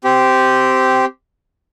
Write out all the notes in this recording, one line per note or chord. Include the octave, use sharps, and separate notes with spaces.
C4 G4